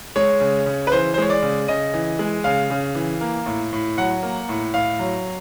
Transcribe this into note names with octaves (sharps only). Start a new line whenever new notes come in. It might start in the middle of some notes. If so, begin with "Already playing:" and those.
G#3 C#5
C#3
C#3
B4
E3 C5
C5
G#3 C#5
D5
C#3
C#3 D#5
E3
G#3
C#3 F5
C#3
E3
A#3
A2
A2
F#3 F#5
A#3
A2
A2 F5
F#3